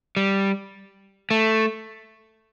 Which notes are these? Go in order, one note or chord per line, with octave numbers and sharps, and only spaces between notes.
G3
A3